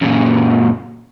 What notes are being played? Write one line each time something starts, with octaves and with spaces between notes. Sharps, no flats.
F#2 A#2